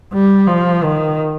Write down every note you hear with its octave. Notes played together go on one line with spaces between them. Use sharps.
G3
F3
D#3